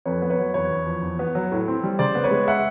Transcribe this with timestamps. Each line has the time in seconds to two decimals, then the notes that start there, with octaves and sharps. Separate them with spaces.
0.05 F2 B4 C#5
0.22 B3
0.30 B4 C#5
0.39 F#3
0.54 E2 B4 C#5
0.71 E2
0.87 F3
1.02 E2
1.19 B3
1.35 F#3
1.52 A2
1.68 C4
1.83 G3
1.99 C#3 C5 D5
2.15 B3
2.24 B4 C#5
2.31 G#3
2.48 E5 F#5